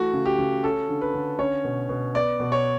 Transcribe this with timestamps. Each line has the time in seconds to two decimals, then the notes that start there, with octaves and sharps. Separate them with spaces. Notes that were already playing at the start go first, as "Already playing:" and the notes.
Already playing: E3 A3 F#4
0.13 C#3
0.26 G4
0.39 C#3
0.63 C#4 A4
0.89 D3
1.01 B4
1.14 D3
1.39 C#4 C#5
1.64 B2
1.89 B2
2.15 B3 D5
2.40 B2
2.52 C#5